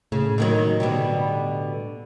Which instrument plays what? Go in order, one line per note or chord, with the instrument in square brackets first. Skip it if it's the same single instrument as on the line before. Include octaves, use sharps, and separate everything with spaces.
[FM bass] A2 [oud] C#3
[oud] D3 D#3 F#3
B2 D3 G3